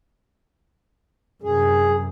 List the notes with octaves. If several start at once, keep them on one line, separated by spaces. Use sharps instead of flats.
F#2 C3 G#4